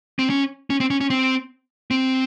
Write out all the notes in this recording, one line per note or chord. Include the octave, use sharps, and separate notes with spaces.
C4
C#4
C#4
C4
C#4
C#4
C4
C4